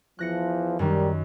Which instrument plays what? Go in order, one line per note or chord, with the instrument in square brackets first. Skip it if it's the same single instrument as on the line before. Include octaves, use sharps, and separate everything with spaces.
[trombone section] E2 E3 F3 [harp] F#6 A#6 C#7
[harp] F#2 D#3 [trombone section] G3 A#4